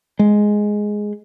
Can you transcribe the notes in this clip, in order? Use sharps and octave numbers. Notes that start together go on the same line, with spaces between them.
G#3